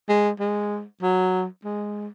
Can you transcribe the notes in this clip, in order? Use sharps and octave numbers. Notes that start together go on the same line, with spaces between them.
G#3
G#3
F#3
G#3